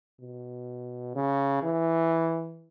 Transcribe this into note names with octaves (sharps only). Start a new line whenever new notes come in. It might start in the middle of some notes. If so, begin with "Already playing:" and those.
B2
C#3
E3